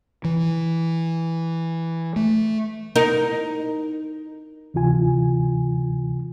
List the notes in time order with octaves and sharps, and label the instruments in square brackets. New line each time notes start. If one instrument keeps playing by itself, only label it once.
[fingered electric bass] E3
A3
[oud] D#4 A#4
[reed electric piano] D2 C3 E3 F4 G#5